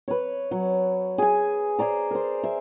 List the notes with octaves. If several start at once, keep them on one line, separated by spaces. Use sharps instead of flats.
B4 C#5
F#3
G#4 G#5
G#4 C5 D5 A#5
A#4 C5
E5